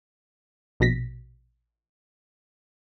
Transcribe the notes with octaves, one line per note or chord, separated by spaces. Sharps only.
A#1 B2 A#6 B6